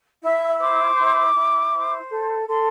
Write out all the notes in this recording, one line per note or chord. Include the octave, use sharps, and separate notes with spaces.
E4 E5
C5 D6
E4
E4
C5
A4
A4 C6